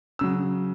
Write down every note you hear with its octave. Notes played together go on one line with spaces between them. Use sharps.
C#3 F#3 E6